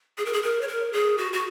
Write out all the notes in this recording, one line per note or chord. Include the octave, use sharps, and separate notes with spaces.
G#4
A#4
G#4
A#4
C#5
A#4
G#4
F#4
F#4